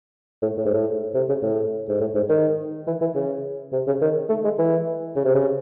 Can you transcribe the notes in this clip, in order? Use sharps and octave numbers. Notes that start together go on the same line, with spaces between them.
A2
A2
G#2
A2
C3
C#3
A2
G#2
A2
G#2
D#3
E3
E3
C#3
C3
C#3
D#3
A3
G#3
E3
C#3
C3
C#3